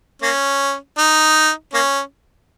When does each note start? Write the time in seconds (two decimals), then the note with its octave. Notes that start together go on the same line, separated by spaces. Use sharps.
0.22 A#3 C#4
0.98 D#4
1.74 A#3 C#4